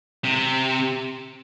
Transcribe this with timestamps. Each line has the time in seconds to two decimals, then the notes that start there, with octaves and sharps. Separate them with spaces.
0.25 C3